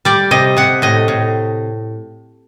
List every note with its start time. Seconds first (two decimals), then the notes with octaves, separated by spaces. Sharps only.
0.05 G3 D5
0.31 C3 D#5
0.57 C3 F#5
0.82 A2 D#5
1.08 A2